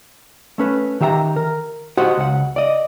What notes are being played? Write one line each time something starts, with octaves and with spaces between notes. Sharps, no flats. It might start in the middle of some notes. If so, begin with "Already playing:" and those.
A3 C#4 B4
D#3 G4 E5 F5 A#5
A#4
F#4 G4 C5 D#5 F#5
C#2 F#5
D5 D#5